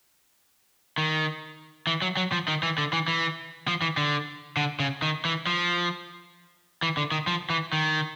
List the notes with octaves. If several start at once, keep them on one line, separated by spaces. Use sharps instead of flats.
D#3
E3
F#3
F#3
F3
D#3
E3
D3
E3
E3
F3
E3
D3
D3
C#3
D#3
E3
F3
E3
D3
D#3
F3
E3
D#3